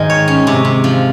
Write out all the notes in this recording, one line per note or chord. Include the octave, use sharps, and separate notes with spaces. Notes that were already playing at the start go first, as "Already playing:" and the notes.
Already playing: G#2 D#3 G#3
C#5
C#4
C3
C3
F3